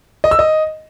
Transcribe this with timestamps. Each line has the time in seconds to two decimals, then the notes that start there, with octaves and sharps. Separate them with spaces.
0.24 D#5
0.31 E6
0.39 D#5